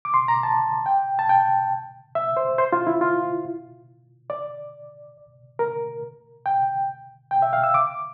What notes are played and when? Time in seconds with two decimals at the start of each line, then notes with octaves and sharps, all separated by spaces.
0.05 D6
0.14 C6
0.28 A#5
0.43 A5
0.86 G5
1.19 A5
1.29 G5
2.15 E5
2.37 C5
2.58 C5
2.73 F4
2.87 E4
3.01 F4
4.30 D5
5.59 A#4
6.46 G5
7.31 G5
7.42 E5
7.53 F5
7.64 E6
7.74 D6